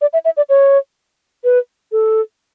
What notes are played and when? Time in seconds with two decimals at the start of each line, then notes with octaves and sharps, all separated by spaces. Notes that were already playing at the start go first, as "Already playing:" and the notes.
0.01 D5
0.13 E5
0.25 E5
0.37 D5
0.49 C#5
1.44 B4
1.92 A4